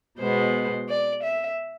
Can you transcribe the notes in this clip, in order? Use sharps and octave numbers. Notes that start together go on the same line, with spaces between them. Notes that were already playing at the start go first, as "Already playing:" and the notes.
B2 G#3 B3 C5
D5
E5